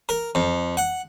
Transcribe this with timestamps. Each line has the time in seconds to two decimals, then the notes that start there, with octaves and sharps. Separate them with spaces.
0.09 A#4
0.35 F2
0.77 F#5